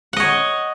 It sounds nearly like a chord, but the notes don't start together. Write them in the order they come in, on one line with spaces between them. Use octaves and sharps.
F#5 D#5 C#5